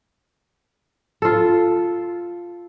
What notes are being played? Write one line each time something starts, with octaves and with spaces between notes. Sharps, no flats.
F4 A4